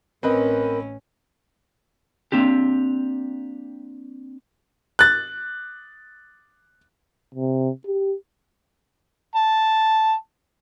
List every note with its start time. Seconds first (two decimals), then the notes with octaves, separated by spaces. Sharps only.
0.23 A1 C4 C#4 A#4 B4 D#5
2.32 A#3 C4 D4 G4
4.99 F#6 A6
7.34 C3
7.86 G4
9.36 A5